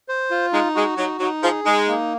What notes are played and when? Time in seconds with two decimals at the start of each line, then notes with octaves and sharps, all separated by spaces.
0.08 C5
0.31 F4
0.53 G#3 D#4
0.75 G#3 F#4
0.97 F#3 D#4
1.20 F#3 D#4
1.42 F3 G#4
1.64 G#3 D#4
1.88 A#3